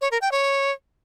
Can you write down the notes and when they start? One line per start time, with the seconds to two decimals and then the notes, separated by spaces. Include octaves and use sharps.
0.01 C#5
0.11 A#4
0.22 G5
0.32 C#5